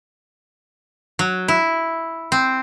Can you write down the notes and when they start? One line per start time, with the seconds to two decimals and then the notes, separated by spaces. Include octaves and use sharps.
1.19 F#3
1.48 E4
2.32 C4